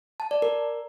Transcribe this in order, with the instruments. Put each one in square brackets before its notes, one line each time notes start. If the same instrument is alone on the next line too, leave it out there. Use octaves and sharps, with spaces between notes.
[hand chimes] A5
D5
A#4